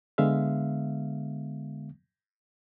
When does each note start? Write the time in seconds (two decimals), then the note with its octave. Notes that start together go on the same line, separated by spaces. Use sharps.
0.18 D3 G#3 B3 E5 F5